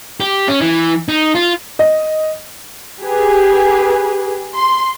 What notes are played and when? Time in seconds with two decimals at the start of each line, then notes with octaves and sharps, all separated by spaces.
0.20 G4
0.48 C#4
0.61 E3
1.09 D#4
1.35 F4
1.79 D#5
3.00 G4 G#4 B4
4.55 C6